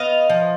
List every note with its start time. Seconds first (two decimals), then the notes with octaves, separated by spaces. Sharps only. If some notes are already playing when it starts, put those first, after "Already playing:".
Already playing: B3 D#5 F5
0.30 F3